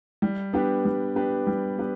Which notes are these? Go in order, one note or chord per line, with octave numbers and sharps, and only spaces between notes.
G3
B3 D4 G4 B4
G3
B3 D4 G4 B4
G3
B3 D4 G4 B4